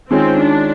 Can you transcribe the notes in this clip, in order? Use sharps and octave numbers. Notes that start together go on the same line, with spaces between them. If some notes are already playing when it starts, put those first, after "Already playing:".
D#3 G#3 C4 C#4 F4
D4